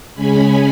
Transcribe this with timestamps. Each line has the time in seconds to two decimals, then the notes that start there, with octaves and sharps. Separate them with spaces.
0.15 C#3 G#3 C#4 G#5 B5